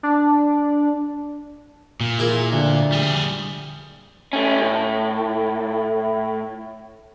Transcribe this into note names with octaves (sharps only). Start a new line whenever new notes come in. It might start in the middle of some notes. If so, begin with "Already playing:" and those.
D4
A#2
E4 G#4 A#4
D2
G3 G#4
A3 C#4
A2